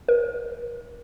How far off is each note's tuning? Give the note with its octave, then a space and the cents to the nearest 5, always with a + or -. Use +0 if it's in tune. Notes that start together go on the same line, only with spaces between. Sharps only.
A#4 +45